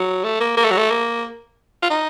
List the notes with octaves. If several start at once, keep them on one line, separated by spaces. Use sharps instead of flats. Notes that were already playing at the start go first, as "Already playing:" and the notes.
Already playing: F#3
A3
A#3
A#3
A3
F#3
A3
A#3
F4
D#4